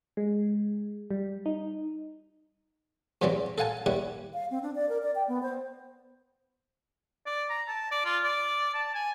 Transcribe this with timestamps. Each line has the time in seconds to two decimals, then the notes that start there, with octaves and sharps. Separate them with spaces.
0.17 G#3
1.10 G3
1.46 D#4
3.22 E2 B2 E3 F#3 G3 C4
3.58 A4 F5 F#5 G#5 A5
3.86 D#2 G3 E4 F#5
4.34 F5
4.51 C4
4.63 D4
4.75 D5
4.89 A#4
5.02 D5
5.15 G5
5.28 B3
5.43 C5
7.26 D5
7.50 A#5
7.68 A5
7.92 D5
8.05 F4
8.24 D5
8.74 A5
8.94 G#5